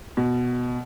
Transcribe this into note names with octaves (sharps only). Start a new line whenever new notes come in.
B2